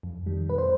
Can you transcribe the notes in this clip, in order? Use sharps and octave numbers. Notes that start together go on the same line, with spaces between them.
F2
D#3 G3
B2 B4
C5